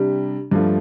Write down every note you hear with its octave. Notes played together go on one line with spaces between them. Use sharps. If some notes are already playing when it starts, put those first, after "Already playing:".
Already playing: C3 G3 D4
G2 F3 A3